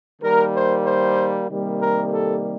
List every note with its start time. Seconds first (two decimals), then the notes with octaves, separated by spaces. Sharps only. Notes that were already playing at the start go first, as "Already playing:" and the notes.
0.22 D#3 G3 A#3 A#4
0.53 C5
0.85 C5
1.48 C3 D#3 G3 A#3
1.80 A#4
2.11 A4